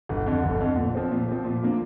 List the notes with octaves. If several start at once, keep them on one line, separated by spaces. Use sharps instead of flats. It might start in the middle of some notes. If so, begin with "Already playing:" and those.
G1
F2 D3
G1
F2 D3
A#2
F3 C4
A#2
F3 C4
A#2
A#3 D4 F4